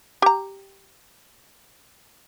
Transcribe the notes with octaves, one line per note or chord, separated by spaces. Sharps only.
G4 A#5